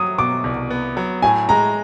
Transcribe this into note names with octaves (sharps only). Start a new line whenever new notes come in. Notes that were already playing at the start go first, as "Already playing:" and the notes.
Already playing: F#3 D#6
B2 D6
C2
B3
F#3
A2 G#5
G#3 A#5